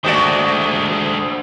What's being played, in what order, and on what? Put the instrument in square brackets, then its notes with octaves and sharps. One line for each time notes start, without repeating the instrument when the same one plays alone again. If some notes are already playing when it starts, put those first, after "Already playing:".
[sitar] D#3 F#4 D5 [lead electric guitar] G#3 A3 [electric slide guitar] D4 C5